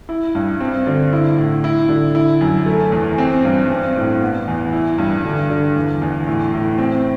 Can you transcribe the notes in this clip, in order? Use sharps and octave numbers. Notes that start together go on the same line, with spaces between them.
E4
G2
C4
D3
E4
A2
E4
D3
E4
F#2
A3
E2
C4
G2
C4
A2
B3
E2
E4
G2
D3
D3
E2
E2
A2
A2
C4